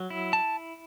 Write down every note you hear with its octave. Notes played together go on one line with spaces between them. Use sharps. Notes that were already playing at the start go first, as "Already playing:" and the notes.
Already playing: F#3
E4
A5